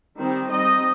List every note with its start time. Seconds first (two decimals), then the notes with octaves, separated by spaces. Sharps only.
0.17 D#3 G3 C4 D#4
0.49 G3 C4 D#4 D#5